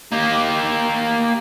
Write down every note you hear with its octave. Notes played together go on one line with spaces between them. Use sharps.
A#3 G4